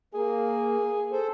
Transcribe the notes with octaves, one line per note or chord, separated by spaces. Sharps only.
A#3 G#4
A4 C5